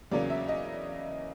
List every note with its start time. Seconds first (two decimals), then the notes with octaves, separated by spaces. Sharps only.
0.12 E2 C#3 F#3 A#3 C#4 D5
0.30 E5
0.48 D#5